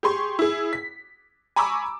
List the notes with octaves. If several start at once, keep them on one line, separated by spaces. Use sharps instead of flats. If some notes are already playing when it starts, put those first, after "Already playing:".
G4 G#4 C6 C#6
E4 G#4
B6
G#5 A#5 B5 C#6 D6 E6